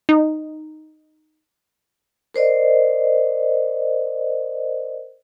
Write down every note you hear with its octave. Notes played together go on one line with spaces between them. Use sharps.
D#4
A#4 C5 D5 D#5